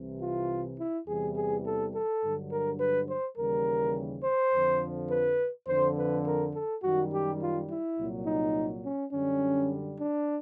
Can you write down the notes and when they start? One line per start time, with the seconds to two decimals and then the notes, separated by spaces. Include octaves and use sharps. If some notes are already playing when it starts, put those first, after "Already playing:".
Already playing: C2 C3 E3
0.21 F4
0.79 E4
1.07 E2 C3 E3 G3 G#4
1.36 G#4
1.65 A4
1.93 A4
2.23 G2 D3 F#3
2.51 A#4
2.80 B4
3.09 C5
3.37 D#2 C#3 E3 G3 A#4
4.24 C5
4.53 F2 D3 F3
5.10 B4
5.67 F2 D3 F3 C5
5.97 B4
6.25 A#4
6.54 A4
6.83 F#2 D#3 G3 F#4
7.12 G4
7.40 F4
7.69 E4
7.98 C2 A#2 F#3
8.27 D#4
8.84 C#4
9.13 F#2 D3 G3 C#4
9.99 D4